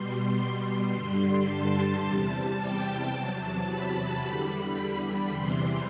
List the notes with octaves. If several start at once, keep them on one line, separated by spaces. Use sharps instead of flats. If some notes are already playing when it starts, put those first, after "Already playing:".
Already playing: B2 G3 C6
C6
G2 D3 G3
A5
E2 C3 G3
G5
E2 C3 F#3 A5
B5
E2 D3 G3 B5
E2 C3 E3 G3 C6